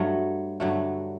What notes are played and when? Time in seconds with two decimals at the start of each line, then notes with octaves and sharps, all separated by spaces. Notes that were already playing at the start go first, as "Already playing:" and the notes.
Already playing: G2 F#3 A3
0.60 G2 D3 F#3 A3